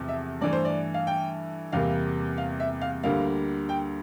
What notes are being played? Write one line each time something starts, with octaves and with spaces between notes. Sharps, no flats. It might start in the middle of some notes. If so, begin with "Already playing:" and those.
Already playing: E2 C3 F3 A3
E5
G2 E3 A3 D5
C5
D5
F5
G5
E2 C3 G3 A#3 F5
F5
E5
F5
D2 D3 G3 A#3 F5
G5